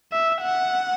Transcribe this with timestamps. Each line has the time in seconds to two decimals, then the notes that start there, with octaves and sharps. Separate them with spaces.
0.12 E5
0.41 F#5